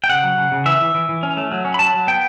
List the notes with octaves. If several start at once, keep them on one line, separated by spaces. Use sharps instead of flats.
G5
C#3 F#5
F#3
C#3
C#3
E3 E5
E3
E3
E3
C#4
A3
F#3
C#4
B5
F#3 A5
F#3
B3 G5